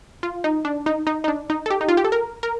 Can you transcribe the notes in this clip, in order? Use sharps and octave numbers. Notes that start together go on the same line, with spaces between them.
F4
D#4
D4
D#4
D#4
D#4
D4
D#4
A4
G4
D#4
F4
G4
A4
A#4
A#4